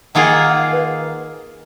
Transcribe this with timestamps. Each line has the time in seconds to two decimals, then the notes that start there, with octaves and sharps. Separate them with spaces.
0.15 D#3 A#3 F4 G#4 F#5
0.37 F#5
0.59 F5
0.70 B4